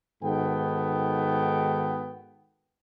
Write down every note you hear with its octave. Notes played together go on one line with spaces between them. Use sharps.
G#2 D#3 B3 F#4 A4 G5